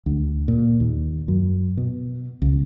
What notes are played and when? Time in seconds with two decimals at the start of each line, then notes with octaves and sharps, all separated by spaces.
0.06 D2
0.48 A#2
0.80 D#2
1.28 F#2
1.77 B2
2.42 C#2